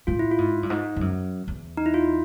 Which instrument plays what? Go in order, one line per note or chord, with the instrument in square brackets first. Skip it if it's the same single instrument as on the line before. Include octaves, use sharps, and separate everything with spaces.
[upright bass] A2 [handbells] F4
[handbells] E4
F4
[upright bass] G#2
G2
G#2
G2
F#2
E2
[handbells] D#4
E4
F4